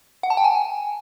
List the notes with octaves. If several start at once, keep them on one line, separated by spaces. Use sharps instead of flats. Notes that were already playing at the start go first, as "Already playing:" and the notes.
F#5
A5
G5
G#5